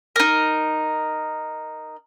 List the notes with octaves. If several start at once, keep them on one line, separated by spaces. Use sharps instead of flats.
D#4 A#4